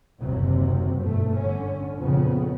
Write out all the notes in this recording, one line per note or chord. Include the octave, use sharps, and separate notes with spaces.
F#1 D#2 C3 F#3
G1 B2 A3
D3 C#4
A#1 F2 C#3 F3 B3